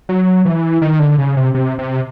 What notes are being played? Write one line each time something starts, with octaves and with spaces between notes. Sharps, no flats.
F#3
E3
D#3
D3
C#3
C3
C3
C3